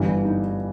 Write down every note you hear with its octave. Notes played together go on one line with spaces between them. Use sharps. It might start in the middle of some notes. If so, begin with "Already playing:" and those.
Already playing: G1 G2 E3 G3
D#4